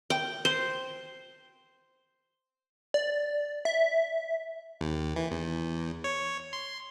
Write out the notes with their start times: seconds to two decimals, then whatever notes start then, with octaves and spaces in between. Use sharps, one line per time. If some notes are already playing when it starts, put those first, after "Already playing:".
0.10 G5
0.45 C5
2.94 D5
3.65 E5
4.81 D#2
5.16 E3
5.31 E2
6.04 C#5
6.53 C6